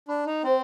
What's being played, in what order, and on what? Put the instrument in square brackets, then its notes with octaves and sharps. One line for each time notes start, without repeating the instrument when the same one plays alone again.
[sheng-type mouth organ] D4 [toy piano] B5
[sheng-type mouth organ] D#4
[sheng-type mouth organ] C4 [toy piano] C5